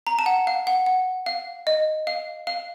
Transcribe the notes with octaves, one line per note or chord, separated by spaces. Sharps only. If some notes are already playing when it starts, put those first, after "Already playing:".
A#5
A5
F#5
F5
F#5
F#5
F5
D#5
F5
F5